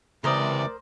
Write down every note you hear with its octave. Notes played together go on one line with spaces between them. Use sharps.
C#2 C3 E3 A#4 C5 D5 D#6